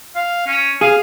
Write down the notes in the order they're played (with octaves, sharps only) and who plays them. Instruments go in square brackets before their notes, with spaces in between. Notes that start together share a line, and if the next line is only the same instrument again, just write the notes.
[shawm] F5
C#4
[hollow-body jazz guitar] G#4 [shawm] F5